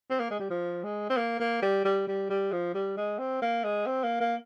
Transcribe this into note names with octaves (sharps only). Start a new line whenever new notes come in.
C4
A#3
G#3
G3
F3
G#3
C4
A#3
A#3
G3
G3
G3
G3
F3
G3
G#3
C4
A#3
G#3
C4
A#3
A#3